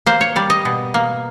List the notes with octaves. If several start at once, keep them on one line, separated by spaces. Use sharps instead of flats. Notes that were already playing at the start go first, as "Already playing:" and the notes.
A#3 C5
C#5
G3 D5
D#5
B2
A#3